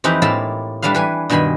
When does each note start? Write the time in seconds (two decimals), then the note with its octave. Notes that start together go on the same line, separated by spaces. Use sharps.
0.04 F2 E3 C4 D#4 G4 B4
0.22 A2 A#3 E4 F4 A5 B5
0.82 G3 A3 D4 B4 F5
0.95 E3 B4 G#5
1.30 G2 B2 D#3 G#5 B5 C6